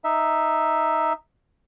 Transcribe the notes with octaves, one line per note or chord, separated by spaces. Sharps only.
D#4 E5